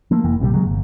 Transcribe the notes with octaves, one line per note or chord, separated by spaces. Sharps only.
F3 A3 A#3
F1 E3 A#3
A#1 C3 E3 G3
C#3 F#3 G#3
G1